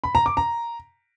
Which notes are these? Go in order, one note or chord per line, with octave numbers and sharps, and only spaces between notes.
B5
A#5
D6
A#5